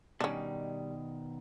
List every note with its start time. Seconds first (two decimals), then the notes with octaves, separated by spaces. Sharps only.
0.20 B2 D#3 G3 C#4 D4